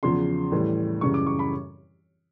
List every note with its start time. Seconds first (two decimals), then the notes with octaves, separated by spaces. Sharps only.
0.03 E2 C#3 F3 C6
0.52 A2 E3 G3
1.01 F#2 C#3 E3 G3 C#6
1.14 D6
1.27 C#6
1.39 B5